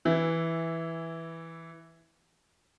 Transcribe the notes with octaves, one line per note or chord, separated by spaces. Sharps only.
E3 E4